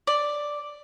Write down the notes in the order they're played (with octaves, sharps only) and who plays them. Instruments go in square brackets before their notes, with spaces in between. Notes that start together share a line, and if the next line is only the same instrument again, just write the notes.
[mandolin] D5